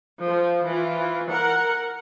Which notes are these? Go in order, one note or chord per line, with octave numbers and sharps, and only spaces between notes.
F3
E3 F4
A#4 F#5